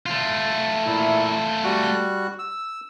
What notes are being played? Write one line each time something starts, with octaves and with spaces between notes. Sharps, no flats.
A3 F4
A#2 E4
G3 F#4 F#6
E6